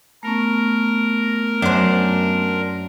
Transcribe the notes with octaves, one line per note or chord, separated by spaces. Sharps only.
A3 B3 C#4 A#4
F#2 D4 C5